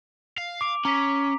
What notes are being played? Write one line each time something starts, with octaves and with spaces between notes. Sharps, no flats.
F5
D6 D7 F7
C#4 A#5 D6 B6